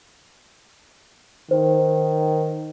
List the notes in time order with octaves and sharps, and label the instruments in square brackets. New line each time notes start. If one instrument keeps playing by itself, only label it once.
[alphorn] D#3 [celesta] C5